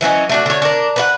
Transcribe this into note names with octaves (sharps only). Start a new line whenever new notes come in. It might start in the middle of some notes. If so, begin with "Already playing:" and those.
E3 F#3 C#4 D#4
A3 D4 F#4
D3 C#5
D4 A#4
B4 C#5 F#5